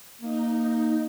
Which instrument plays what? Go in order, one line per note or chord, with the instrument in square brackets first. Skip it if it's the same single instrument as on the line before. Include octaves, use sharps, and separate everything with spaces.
[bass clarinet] A#3 [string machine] D#4